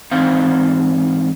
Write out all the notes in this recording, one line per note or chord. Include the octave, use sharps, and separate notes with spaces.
G#2 E3 C4 D#4 C5 F5